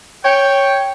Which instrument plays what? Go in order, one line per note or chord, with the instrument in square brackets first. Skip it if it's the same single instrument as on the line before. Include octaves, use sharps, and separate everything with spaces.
[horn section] C#5 G5